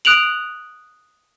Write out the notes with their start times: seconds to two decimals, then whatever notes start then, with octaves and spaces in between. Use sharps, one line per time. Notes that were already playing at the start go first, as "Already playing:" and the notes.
0.05 D#6 F#6 D7 F7 F#7